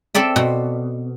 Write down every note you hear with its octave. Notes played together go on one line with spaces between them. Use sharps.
C4 A4 D5 E5
B2